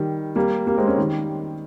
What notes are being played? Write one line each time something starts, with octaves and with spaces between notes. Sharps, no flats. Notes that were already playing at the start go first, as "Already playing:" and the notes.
Already playing: D#3 G3
G3 A#3
G3 A#3
G#3 C4
A#3 C#4
D#3 G3